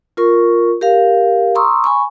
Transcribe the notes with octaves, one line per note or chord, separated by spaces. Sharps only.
F4 A#4 C#6
G4 A#4 F5
A#5 C6 C#6 D#6 E6
G#5 B5 C#6